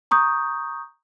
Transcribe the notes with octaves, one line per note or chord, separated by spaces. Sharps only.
A#5 C#6 D#6 G6